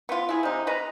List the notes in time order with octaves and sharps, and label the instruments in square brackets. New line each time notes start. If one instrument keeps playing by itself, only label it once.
[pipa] B3 F4
E4 G#4
C3 D#4
B4 D#5 A#5